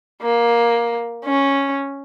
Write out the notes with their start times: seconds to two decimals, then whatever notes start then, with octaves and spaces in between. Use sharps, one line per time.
0.22 A#3
1.25 C#4